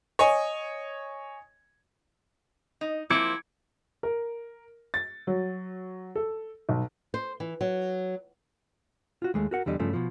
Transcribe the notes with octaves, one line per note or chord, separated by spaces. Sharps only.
C#5 D#5 G#5
D#4
F3 A#3 C4 E4 D6 G#6 C#7
A#4
A6
F#3
A4
B1
C5
E3
F#3
F4 F#4
D#2 G#3 A3
F#4 A#4 F#5
E2 D3 G3 D#5
G2 C#3 F3 A3 C#4
B2 F3